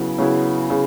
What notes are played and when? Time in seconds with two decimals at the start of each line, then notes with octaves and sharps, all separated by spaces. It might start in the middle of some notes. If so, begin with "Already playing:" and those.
Already playing: C#3 F#3 B3 E4
0.18 C#3 F#3 B3 E4
0.70 C#3